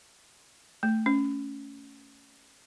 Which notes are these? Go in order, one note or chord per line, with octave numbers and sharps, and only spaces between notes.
A3
C#4